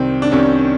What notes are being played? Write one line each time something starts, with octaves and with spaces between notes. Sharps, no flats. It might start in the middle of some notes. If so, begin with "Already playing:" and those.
Already playing: C2 C3 D#3 C4
D4
C2 C3 D#3 C#4